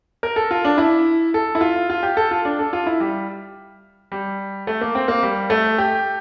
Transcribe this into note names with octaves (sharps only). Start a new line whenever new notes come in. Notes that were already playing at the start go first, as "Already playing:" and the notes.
A#4
A4
F4
D4
E4
A4
E4
F4
F4
G4
A4
F4
D4
A4
F4
E4
G3
G3
A3
A#3
C4
A#3
G3
A3
G4